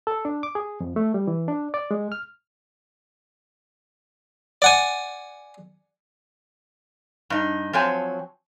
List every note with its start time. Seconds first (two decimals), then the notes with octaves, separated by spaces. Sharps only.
0.07 A4
0.25 D4
0.43 D6
0.55 G#4
0.80 F2
0.96 A3
1.14 G3
1.27 E3
1.48 D4
1.74 D5
1.91 G#3
2.12 F6
4.62 D5 F#5 G#5
7.30 G2 D#4
7.73 F3 F#3 C4 C#5 G#5 A5